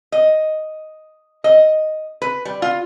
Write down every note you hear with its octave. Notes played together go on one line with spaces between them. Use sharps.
D#5
D#5
B4
G3
F4